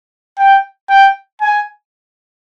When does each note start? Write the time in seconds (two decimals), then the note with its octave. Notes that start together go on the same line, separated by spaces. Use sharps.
0.39 G5
0.90 G5
1.41 G#5